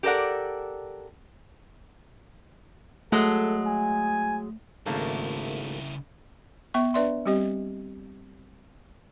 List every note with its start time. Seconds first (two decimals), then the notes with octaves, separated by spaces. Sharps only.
0.03 G4 A4 A#4 D5 F#5
3.12 F#3 G#3 A3 A4
3.66 G#5
4.86 G#1 C#3 A3 A#3 E4
6.74 B3 E5 C#6
6.94 D4 B4 D5 E5 C6
7.25 G3 C4 G4 D#5